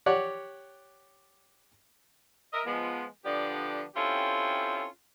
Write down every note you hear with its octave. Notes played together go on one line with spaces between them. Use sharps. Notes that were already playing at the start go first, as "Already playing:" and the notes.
G4 C#5 D5 F#5
A#4 D#5 E5
F3 G#3 B3
D3 F3 B3 D4 G4 D5
C4 C#4 E4 F4 G4 A4